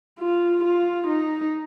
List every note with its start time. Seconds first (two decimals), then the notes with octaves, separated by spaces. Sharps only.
0.19 F4
0.63 F4
1.07 D#4